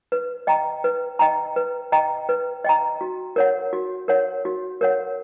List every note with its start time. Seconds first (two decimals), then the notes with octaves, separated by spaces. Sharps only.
0.12 B4
0.47 D#5 G5 A#5
0.84 B4
1.19 D#5 G5 A#5
1.56 B4
1.92 D#5 G5 A#5
2.29 B4
2.64 D#5 G5 A#5
3.01 F#4
3.36 A#4 C#5 F#5
3.73 F#4
4.08 A#4 C#5 F#5
4.45 F#4
4.81 A#4 C#5 F#5